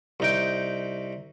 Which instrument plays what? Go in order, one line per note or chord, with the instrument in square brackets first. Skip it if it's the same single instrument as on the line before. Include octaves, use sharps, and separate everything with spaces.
[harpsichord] C2 D#4 G5